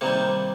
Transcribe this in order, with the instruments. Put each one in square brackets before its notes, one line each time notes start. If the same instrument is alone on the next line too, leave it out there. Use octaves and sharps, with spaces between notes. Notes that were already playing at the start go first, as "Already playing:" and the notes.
[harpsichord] C3 D#3 G3 A#3